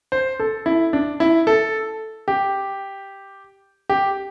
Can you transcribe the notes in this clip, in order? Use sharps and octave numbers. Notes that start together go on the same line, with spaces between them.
C5
A4
E4
D4
E4
A4
G4
G4